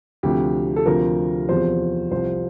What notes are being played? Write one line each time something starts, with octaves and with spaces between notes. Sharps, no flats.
D2 C3 F3 G4
A4
D2 C3 F3 A#4
E2 C3 F3 C5
C2 C3 F3 C5